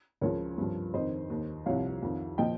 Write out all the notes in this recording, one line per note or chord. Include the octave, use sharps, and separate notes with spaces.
C#2 C#3 F3 A#4 C#5
G2 F3
F2 D#3 C5 D#5
D#2 D#3
C2 C3 F3 C#5 F5
F2 D#3
A#2 F3 D#5 G5